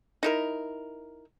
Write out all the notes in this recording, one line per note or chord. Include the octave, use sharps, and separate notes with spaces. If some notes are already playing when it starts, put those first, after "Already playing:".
D#4 E4 A#4